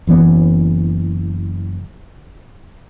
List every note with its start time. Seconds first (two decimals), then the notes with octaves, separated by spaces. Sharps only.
0.07 F#1 E3 B3